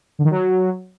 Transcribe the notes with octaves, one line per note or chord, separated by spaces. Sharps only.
D3
D#3
F#3